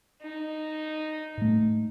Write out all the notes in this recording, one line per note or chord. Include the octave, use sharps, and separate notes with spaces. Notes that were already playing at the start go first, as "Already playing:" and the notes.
D#4
A2 A3